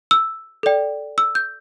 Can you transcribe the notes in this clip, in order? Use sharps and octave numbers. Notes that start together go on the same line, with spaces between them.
E6
A4 D5 G5
E6
G6